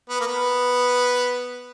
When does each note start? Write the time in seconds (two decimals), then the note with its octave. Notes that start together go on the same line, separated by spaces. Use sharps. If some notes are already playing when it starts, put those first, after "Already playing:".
0.09 B3
0.21 A#3
0.27 B3